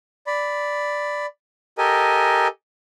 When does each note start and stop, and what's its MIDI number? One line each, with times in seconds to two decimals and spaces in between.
0.27 1.26 74
0.27 1.26 83
1.78 2.48 67
1.78 2.48 69
1.78 2.48 70
1.78 2.48 75
1.78 2.48 80